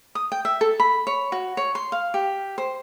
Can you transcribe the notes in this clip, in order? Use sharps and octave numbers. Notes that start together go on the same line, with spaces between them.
D#6
G5
E5
A4
B5
C#5
F#4
C#5
C6
F5
G4
C5